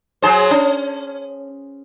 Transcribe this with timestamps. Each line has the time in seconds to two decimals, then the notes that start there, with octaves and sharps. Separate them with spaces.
0.22 F#3 G#4 C5
0.51 C#4